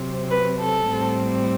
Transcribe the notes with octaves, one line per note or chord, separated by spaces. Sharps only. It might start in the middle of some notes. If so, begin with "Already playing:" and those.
Already playing: C3 F#3 C4
B4
A4
A2 G3 C4